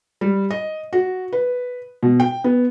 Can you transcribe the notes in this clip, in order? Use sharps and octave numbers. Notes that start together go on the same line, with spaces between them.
G3
D#5
F#4
B4
B2
G5
B3